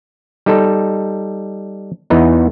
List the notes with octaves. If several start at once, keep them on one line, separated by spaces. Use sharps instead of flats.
G3 D#4 A4
E2 E3 B3 D#4